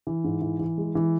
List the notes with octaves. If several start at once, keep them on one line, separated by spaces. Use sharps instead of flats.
E3
G#2
E3
E3
G#3
E3